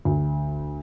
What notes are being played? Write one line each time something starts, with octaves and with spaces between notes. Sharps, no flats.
D2